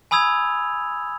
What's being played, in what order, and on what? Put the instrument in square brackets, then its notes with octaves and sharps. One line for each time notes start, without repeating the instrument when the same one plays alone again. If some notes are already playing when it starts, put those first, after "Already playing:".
[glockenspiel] G#5 B5 D#6 E6 G#6 F7